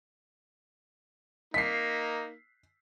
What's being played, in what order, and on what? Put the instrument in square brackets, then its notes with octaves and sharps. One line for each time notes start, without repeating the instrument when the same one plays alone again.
[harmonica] A#3 D#4 [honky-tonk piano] B6 C7